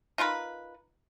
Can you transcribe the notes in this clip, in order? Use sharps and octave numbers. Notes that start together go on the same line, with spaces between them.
D#4 F4 A#4 B4